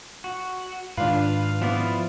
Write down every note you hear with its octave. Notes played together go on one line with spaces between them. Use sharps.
F#4
G#2 D#3 D4 F4 B4 F5
F3 B3 E4 D5